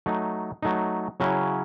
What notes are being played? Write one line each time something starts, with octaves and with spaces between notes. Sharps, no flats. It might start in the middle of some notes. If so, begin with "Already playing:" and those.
F#3 A3 D#4
F#3 A3 D#4
C#3 F#3 C#4 E4